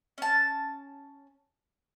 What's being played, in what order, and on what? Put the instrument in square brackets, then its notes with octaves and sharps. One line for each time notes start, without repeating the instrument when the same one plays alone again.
[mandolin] C#4 A5